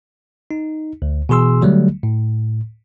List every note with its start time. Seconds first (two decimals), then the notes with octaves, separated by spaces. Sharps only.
0.51 D#4
1.02 D2
1.29 B2 E3 G#4 C6 E6
1.62 D3 F#3 G3 A3
2.03 A2